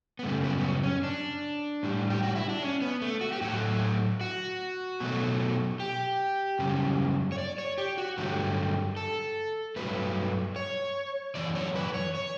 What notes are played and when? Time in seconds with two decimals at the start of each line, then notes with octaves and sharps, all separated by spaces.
0.19 B3
0.23 F#2 C#3 G3 A3
0.44 B3
0.58 B3
0.64 C#4
0.83 C#4
1.03 D4
1.83 A2 G3
2.10 G4
2.23 F#4
2.35 E4
2.49 D4
2.62 C#4
2.82 B3
3.02 A3
3.21 F#4
3.32 G4
3.41 A2 F#3 A3 F#4
4.21 F#4
5.00 B2 F#3 A3
5.80 G4
6.59 F#2 C#3 G3
7.32 C#5
7.38 D5
7.58 C#5
7.78 G4
7.98 F#4
8.18 G2 D3 F#3 A3 G4
8.97 A4
9.76 G2 F#3 A3 B4
10.56 C#5
11.35 F#2 E3 D5
11.55 C#5
11.75 B4
11.94 C#5
12.15 C#5